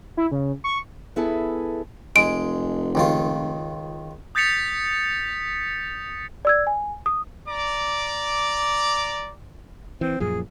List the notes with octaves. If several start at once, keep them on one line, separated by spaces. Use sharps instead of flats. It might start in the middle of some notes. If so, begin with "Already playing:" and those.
E4
C#3
C#6
B3 E4 G#4 A4
F1 G#3 D7
C#2 D#3 F4
D#6 G6 A6 B6 C#7 F7
D5 E6 G#6
G#5
D#6
D5 A#5 D6
E3 C4
F#2 A#2 F3 G#4